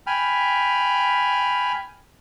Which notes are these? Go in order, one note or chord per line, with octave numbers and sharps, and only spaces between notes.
G5 G#5 B5 F6